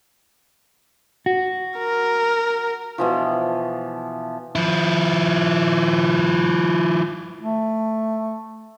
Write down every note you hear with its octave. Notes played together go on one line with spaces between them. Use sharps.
F#4
A#4
B2 E3 F3
F3 E4
A3